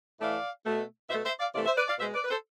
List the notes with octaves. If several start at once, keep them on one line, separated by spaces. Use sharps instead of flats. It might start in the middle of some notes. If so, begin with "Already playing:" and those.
A2 E3 A3 D5 F5
B2 A3
B2 A3 C5 E5
C5 E5
D5 F5
C3 E3 A3 D5 F5
C5 E5
B4 D5
D5 F5
B2 G#3 C5 E5
B4 D5
B4
A4 C5